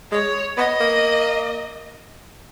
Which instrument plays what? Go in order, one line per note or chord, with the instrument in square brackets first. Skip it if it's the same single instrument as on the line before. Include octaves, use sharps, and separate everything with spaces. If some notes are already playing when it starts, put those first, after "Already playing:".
[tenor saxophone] G#3 [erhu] C#5
[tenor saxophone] B3 [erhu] D#5
[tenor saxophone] A#3